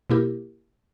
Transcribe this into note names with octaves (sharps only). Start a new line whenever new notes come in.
B2 A#3 E4 G4 A#4